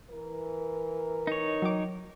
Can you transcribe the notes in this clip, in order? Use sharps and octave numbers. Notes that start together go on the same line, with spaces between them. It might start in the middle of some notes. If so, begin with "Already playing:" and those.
E3 A#4
D#4 C#5
F#3 G5 D6